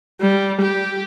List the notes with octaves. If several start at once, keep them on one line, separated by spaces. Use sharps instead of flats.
G3
G4